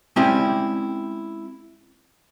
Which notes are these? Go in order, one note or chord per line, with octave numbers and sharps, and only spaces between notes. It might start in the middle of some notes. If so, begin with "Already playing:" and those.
G#3 C4 C#4 E4 G4 D5